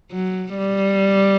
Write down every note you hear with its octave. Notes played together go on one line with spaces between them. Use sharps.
F#3
G3